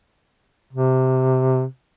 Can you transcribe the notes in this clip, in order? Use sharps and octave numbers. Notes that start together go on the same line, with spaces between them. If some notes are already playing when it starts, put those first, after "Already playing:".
C3